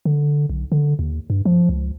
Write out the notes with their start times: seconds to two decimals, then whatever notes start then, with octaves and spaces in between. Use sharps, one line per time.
0.05 D3
0.49 B1
0.72 D3
0.99 D#2
1.30 G2
1.45 F3
1.69 C#2